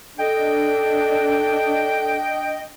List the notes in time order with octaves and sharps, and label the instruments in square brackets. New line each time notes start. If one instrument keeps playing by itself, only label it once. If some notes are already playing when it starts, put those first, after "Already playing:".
[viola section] D4 [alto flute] A4 [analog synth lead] D#5 [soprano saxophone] G5